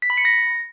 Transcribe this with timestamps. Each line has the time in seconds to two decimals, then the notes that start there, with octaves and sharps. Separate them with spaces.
0.02 B6
0.10 B5
0.17 C#7
0.25 A#6